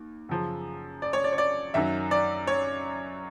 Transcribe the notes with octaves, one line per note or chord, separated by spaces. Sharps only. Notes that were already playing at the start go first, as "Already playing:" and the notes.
Already playing: D#2
F#2 C#3 F3
D5
C#5
D5
C#5
D5
F#2 D#3 F#3 E5
D5
C#5